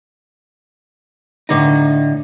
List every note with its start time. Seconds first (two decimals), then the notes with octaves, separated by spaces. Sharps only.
1.49 A2 D3 D#4